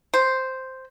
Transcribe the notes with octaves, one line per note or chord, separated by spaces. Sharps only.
C5